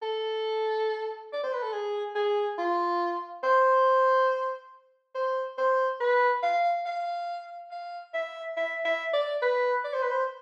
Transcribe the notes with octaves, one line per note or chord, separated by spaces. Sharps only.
A4
D5
C5
B4
A4
G#4
G#4
F4
C5
C5
C5
B4
F5
F5
F5
E5
E5
E5
D5
B4
D5
C5
B4
C5